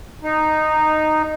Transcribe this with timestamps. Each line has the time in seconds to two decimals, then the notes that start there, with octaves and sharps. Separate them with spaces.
0.23 D#4